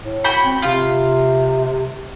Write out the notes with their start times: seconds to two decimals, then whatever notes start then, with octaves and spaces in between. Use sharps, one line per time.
0.01 A2
0.24 F#4 G5 B5
0.45 C4
0.62 C3 F4